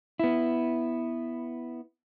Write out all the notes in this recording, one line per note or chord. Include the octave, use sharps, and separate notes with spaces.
B3 E4